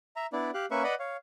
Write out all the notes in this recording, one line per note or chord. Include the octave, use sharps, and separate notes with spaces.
E5 A#5
B3 D4 E4 D5
G4 F5 F#6
A#3 C#4 B4 E5 C#6
B4 D5 D#5 F#5 B5
C#5 F5